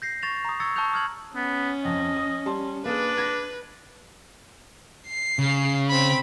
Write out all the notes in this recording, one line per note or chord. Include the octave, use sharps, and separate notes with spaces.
G6 A#6 C7
C#6 A6 A#6 E7 F7
A#5 D#6
C#6 D#6 E6 G#6 A6 C#7
A5 C#6 E6 F#6 G6 F7
D#6 F6 G#6 F#7
B3 C#4
F2 D#5
D#6
G3 A5 C6
A#3 D4 G#4 A#4 B4
G#6 A#6
C7
C#3
C4 B5